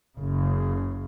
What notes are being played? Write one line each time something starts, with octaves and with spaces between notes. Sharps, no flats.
F#1 C#3